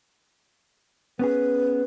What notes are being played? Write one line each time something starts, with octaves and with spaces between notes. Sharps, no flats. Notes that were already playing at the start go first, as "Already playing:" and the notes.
B3 C#4 G#4 B4